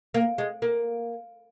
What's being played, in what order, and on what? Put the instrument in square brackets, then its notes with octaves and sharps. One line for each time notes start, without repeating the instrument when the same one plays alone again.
[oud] A#3
G#3
A#3